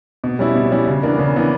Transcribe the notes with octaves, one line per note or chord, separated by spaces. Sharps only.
B2
G3 C#4 E4
B2
G3 C#4 E4
C#3
E3 B3 D4 A#4
C#3
E3 B3 D4 A#4